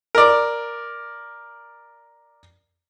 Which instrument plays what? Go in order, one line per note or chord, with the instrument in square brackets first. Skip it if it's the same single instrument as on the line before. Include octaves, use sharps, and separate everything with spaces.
[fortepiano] A#4 D5